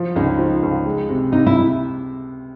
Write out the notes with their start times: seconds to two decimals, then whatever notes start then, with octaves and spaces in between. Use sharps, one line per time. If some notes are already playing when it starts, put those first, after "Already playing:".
Already playing: F3
0.16 C#2 D#4
0.39 F3
0.63 C#2
0.86 G#3
1.09 C3
1.32 C3 D#4
1.47 E4